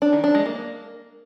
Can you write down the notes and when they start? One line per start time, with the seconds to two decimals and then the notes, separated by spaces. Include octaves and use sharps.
0.02 D4
0.13 D#3
0.24 D4
0.35 G#3
0.46 A#3